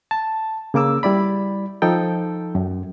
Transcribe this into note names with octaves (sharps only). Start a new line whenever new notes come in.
A5
C#3 A#3 D6 E6
G3 E4 D5 B5
F3 D#4 A4 G5
F#2